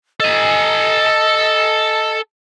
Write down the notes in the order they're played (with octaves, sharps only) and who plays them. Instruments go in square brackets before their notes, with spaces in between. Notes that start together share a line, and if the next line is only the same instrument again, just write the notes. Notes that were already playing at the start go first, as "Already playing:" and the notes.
[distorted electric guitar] A4 G#5 [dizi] D#5